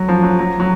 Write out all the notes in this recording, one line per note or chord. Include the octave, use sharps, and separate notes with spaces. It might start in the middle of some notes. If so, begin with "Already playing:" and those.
Already playing: F#3
F3
F#3
F#3
F#3